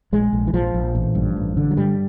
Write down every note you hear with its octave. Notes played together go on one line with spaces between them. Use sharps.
A#1 G#3
A#1
E3
A#1 F3
A#1
A1
G2
A1
D3
F#3
G2 G3